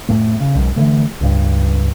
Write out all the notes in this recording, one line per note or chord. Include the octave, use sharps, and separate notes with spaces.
F2 A2 A3
C#3
B1 F#2 G#3
D3 E3 A3
C#2 G2